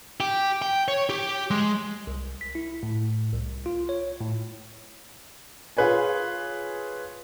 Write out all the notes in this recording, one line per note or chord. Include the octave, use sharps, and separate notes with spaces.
G4
G5
C#5
G4
G#3
C2
B6
E4
A2
C2
F4
C#5
A2
F4 G#4 B4 C#5 G#5